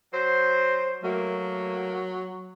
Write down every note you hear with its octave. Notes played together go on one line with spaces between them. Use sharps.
F#3 C5
F#3 A3 A#3